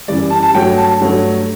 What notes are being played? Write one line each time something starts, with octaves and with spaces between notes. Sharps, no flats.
F#2 E3 G3 D5
A5
A5
G2 F#3 A3 G5
A5
G2 F#3 A3